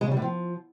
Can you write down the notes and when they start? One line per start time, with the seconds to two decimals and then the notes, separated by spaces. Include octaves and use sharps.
0.01 G#3
0.06 C#3
0.11 G3
0.17 A2
0.22 F3